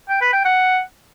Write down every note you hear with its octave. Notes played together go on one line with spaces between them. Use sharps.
G5
B4
G5
F#5